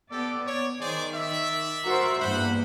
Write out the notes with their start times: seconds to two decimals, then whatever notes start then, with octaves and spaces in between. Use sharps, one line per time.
0.11 B3 G4 A4 D5
0.45 C#5
0.80 D#3 G#4 C5 D5
1.14 D5 E5
1.83 F#4 A#4 C5
2.19 E2 G2 A#3 C5 F#5 B5